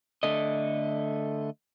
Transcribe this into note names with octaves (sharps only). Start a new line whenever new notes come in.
D3 A3 D#5